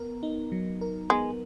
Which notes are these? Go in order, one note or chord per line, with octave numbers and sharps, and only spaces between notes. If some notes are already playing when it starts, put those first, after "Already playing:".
Already playing: B3 A#4
D#4
F#3
A#4
G#3 B3